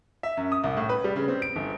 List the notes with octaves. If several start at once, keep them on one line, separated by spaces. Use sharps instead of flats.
E5
F#2
D#6
C2
A2
B4
G3
C#3
C4
D7
G1